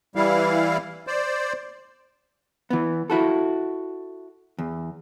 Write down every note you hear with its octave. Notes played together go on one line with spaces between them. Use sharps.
E3 G3 E4 F5
C5 D5
E3 B3
E4 F#4 A4
E2